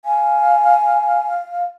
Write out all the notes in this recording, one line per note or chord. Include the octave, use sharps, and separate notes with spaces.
F5 G#5